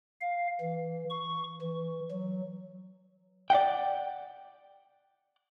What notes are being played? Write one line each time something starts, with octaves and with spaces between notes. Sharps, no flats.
F5
E3
C#6
E3
F#3
D5 E5 F#5 G5